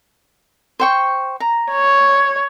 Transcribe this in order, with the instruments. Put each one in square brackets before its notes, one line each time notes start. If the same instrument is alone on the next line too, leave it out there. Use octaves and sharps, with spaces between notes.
[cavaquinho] C5 G5 C#6
A#5
[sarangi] C#5